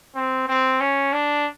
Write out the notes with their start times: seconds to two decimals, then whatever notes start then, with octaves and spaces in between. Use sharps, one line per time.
0.15 C4
0.48 C4
0.80 C#4
1.13 D4